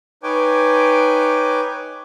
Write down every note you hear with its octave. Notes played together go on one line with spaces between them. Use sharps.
D#4 B4 C#5 G5 G#5 D6